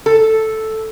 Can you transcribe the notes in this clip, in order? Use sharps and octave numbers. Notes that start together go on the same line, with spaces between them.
A4